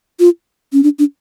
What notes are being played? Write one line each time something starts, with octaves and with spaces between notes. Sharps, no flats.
F4
C#4
D4
D4